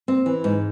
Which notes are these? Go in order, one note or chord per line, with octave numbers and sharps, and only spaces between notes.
C4
E3
G#2